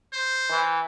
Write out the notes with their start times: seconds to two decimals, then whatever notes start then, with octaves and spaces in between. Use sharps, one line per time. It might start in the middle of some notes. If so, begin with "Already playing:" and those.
0.13 C5
0.51 E3